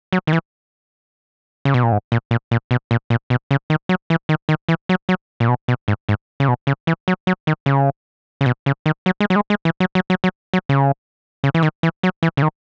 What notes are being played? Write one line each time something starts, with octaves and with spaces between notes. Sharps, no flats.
F#3
D#3
E3
C#3
B2
A#2
G#2
A#2
A#2
A#2
B2
A#2
A#2
B2
C#3
D#3
F#3
E3
D#3
D#3
E3
F#3
F#3
A#2
B2
B2
G#2
G#2
C#3
B2
C#3
E3
F#3
F#3
D#3
C#3
C#3
B2
C#3
D#3
F#3
G#3
F#3
G#3
G#3
E3
F#3
F#3
F#3
F#3
F#3
C#3
C#3
E3
D#3
E3
F#3
E3
C#3
D#3